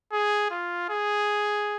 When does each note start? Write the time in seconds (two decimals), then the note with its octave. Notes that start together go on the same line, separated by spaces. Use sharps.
0.12 G#4
0.51 F4
0.89 G#4